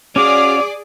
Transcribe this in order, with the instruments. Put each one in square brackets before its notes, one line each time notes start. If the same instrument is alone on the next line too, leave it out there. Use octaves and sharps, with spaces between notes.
[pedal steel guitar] C#4 F#4 F5 [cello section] G#4 D5 [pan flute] D6